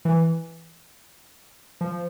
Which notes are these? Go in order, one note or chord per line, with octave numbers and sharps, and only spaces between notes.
E3
F3